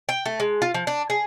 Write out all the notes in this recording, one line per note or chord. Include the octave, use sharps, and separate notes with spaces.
G5
A3
G#3
F4
F3
D4
G#4